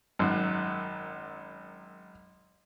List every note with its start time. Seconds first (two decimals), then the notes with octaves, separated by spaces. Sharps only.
0.19 G#1 F#2